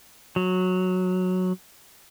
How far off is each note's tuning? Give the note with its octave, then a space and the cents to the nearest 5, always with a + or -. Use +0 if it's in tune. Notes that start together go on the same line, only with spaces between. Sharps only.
F#3 -10